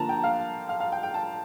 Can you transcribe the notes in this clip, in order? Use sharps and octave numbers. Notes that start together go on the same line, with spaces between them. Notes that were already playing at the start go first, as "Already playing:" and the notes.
Already playing: D3 F3 A#3 A5 A#5
G5
F5
F5
F5
G5
G5
A5